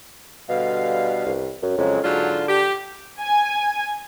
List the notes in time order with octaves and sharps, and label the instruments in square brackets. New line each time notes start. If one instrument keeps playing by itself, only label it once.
[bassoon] B2 [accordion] D3 G3 F5
[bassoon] C2
F#2
[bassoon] F2 [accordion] C#3 F#3 G#3
[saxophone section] G#2 F#3 F4 [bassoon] D3 [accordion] A5
[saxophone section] G4
[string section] G#5